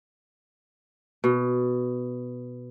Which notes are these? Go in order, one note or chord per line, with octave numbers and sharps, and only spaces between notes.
B2